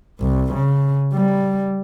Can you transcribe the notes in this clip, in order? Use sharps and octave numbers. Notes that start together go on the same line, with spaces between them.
C2
C#3
G3